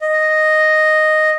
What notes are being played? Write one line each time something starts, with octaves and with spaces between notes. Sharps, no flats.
D#5